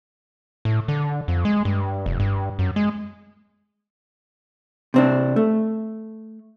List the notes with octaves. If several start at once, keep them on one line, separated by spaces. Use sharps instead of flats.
A2
D3
F2
G#3
G2
F1
G2
F#2
G#3
C3 C4 D4
A3